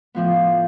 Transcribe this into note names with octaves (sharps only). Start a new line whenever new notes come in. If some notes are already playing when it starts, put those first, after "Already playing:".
A2 F3 B3